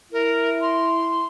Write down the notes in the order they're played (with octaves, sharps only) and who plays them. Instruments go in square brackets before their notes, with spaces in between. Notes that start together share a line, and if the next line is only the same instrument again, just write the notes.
[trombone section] E4 [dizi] A#4
[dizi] C6